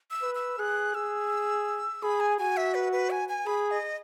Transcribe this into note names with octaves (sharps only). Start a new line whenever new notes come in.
E6
B4
E6
G#4 F#6
G#4 E6
G#4 B5
G#5
F#4 G#5
E5
B4
B4
G#5
G#5
G#4 B5
D#5